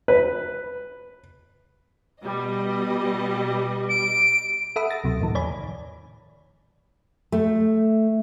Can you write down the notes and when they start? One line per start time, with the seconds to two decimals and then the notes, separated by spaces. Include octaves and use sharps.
0.08 B4
2.21 B2 G3 D#5
3.89 D7
4.76 A4 E5 F#5 B5 D#6 E6
4.90 A6 A#6
5.04 C#2 C3 F#3
5.21 E2 A2 D#3 F3
5.35 C#5 D5 G#5 B5
7.32 A3